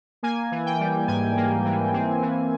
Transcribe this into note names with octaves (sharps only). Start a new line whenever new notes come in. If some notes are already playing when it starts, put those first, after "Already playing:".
A#3 G#5
E3
G5
G3
G#2 G#5
A#3
E3
C4
E3